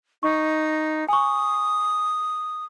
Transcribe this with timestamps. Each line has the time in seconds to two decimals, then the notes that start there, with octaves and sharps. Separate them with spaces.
0.23 D#4 C#6
1.09 G#5 C#6 D#6